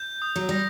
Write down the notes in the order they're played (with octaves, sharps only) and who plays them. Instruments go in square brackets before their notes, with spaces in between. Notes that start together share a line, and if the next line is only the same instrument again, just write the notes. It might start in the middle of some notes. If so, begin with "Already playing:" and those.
Already playing: [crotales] G6
D#6
[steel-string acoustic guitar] F#3
[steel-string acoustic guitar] G3 [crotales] A#6